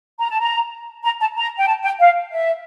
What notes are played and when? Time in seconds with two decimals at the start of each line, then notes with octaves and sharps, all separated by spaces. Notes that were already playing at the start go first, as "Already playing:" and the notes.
0.19 A#5
0.30 A5
0.40 A#5
1.04 A#5
1.20 A5
1.36 A#5
1.58 G5
1.67 A5
1.84 G5
2.00 F5
2.31 E5